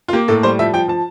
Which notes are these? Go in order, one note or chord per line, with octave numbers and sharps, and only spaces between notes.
F4
A#3 G4
A2 A4
G3 C5
F3 E5
F3 G5
F3 A5